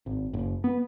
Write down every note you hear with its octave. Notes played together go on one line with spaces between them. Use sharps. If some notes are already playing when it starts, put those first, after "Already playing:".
G#1
F#1
B3